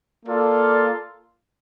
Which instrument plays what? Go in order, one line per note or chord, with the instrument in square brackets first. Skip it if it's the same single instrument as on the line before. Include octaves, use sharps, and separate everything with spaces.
[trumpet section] A#3 F4 A4 D5